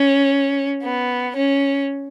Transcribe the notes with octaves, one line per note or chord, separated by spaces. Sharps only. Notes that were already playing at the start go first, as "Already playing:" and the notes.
Already playing: C#4
B3
C#4